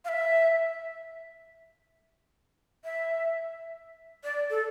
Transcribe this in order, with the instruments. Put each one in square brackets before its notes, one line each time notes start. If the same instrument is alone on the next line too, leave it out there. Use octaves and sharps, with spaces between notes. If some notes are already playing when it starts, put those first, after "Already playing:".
[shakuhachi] F5
E5
E5
D5
A4